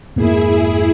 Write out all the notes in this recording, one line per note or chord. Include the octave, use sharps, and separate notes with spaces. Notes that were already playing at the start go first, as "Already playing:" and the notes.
F2 G#2 A#3 E4 G#4